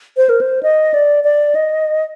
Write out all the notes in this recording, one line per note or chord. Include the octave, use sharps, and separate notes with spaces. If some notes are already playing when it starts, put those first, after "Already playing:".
C5
A#4
C5
D#5
D5
D5
D#5